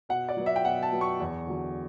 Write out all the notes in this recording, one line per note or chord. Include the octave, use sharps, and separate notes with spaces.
B2 F#5
D5
F#3 B3
E5
G5
B2 F#5
A5
F#3 B3
C#6
E2
D3 F#3